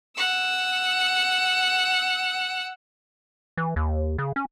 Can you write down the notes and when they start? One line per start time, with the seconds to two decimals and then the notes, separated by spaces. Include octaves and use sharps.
0.17 F#5 E6
3.57 E3
3.76 D#2
4.18 C#3
4.36 C#4